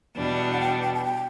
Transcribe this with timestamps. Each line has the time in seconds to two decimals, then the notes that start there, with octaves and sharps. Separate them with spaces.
0.15 E2 B2 G3 D4
0.52 F#5
0.60 G5
0.82 G5
0.94 A5
1.04 G5